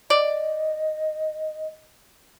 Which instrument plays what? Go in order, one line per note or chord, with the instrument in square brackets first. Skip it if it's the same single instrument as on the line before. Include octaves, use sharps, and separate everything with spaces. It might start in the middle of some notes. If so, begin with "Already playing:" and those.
[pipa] D5 [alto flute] D#5